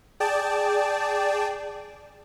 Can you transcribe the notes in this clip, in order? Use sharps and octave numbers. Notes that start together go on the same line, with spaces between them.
G#4 D5 G5 A5